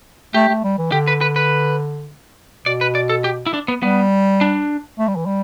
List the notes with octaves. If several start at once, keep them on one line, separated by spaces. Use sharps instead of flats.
A3 G4
A3
G3
E3
D3 G4
B4
B4
B4
B2 D5
B4
D5
A4
G4
E4
D4
B3
G3 B3
D4
A3
G3
E3
G3